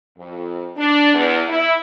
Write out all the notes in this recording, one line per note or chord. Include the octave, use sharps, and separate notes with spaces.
F2
D4
E2
E4